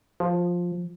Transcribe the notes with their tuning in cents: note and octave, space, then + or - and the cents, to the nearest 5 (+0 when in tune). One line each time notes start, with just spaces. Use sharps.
F3 +10